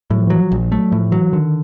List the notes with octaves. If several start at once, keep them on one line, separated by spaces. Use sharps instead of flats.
A2 F#3
F3
E3 F#3
F3
A#1
F#3 A3
A2 F3
E3 F#3
D3 D#3